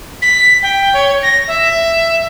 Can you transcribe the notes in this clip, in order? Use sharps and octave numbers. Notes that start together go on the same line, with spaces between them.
B6
G5
C#5
A#6
E5